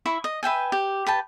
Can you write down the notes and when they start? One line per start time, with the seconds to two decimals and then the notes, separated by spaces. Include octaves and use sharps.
0.06 E4 E5 B5 C#6
0.24 D#5
0.43 B4 E5 G5 G#5
0.72 G4
1.07 B4 G5 A5